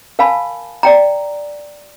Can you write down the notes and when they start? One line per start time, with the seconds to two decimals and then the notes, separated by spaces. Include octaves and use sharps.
0.19 A#4 F5 G#5 A5 B5
0.83 D5 G5 A#5